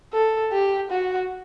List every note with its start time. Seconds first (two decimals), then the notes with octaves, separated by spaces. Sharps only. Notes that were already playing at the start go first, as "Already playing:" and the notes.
0.13 A4
0.52 G4
0.90 F#4